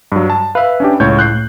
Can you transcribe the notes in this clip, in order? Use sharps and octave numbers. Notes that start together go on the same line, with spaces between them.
G2 F#3
A5
B4 E5 F5
C#4 D4 G4
C#2 A2 C#5 G6
F#6 G6 C7